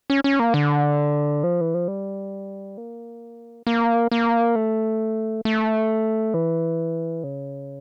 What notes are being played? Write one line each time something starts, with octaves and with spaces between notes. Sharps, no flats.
C#4
C#4
A#3
D3
F3
E3
F3
G3
A#3
A#3
A#3
A3
A3
E3
C#3